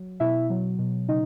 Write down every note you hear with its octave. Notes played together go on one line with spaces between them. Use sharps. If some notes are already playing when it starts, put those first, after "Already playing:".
Already playing: F#3
B2 E4 E5
F#3
B2
C#3 D#4 D#5